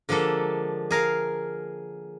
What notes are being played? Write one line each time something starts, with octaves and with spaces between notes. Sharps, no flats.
D3 F3 G#3 A#3 A4
G#4 A#4 F5